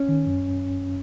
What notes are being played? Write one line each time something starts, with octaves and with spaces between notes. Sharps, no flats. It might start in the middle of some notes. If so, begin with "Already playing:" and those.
Already playing: C#4
D#3
F#2